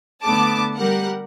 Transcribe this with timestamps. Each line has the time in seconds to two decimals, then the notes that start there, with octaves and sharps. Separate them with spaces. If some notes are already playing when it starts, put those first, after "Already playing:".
0.22 D3 A3 B3 A5 D6
0.76 G3 G4 A#4 F#5